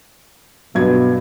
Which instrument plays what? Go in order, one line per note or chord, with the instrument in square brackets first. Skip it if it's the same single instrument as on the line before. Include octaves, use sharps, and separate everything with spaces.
[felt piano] G2 F#3 G#6 [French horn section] B2